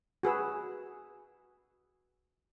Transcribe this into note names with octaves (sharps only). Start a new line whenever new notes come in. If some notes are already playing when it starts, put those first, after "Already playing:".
F#4 G#4 B4 E6